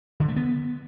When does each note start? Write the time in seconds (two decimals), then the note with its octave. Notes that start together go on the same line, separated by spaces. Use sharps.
0.20 D3
0.28 A3
0.36 B3